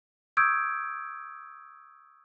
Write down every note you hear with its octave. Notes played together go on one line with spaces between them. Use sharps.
C#6 D#6 E6 G6 G#6 D7